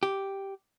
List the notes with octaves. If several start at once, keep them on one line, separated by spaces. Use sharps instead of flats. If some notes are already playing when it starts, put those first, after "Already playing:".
G4